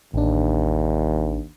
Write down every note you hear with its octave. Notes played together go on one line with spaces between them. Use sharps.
A1 D#2 D4